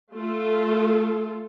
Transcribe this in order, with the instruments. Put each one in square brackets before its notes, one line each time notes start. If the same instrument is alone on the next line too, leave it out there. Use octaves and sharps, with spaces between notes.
[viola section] A3 F4 A4